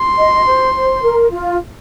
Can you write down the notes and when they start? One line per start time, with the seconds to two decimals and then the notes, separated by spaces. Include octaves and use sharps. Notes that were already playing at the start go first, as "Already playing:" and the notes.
Already playing: C6
0.17 D#5
0.46 C5
0.74 C5
1.02 A#4
1.31 F4